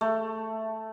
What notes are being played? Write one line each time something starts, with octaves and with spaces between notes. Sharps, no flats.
A3